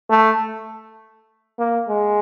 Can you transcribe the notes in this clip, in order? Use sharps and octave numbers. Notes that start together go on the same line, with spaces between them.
A3
A#3
G#3